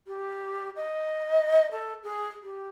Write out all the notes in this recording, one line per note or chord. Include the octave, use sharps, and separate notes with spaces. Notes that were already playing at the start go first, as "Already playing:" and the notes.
G4
D#5
A4
G#4
G4